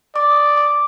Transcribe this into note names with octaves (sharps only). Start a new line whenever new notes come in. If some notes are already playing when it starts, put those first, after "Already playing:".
D5 D6
D#6
D6
D6